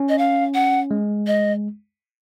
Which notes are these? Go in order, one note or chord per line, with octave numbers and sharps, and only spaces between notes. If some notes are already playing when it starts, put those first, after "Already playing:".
Already playing: C#4
D#5
F5
F#5
G#3
D#5